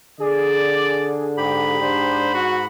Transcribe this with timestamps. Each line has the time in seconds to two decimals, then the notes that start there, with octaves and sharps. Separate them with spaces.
0.20 D3 G#4 D5
1.37 G#2 G4 B5
1.81 D4 C5
2.35 F#4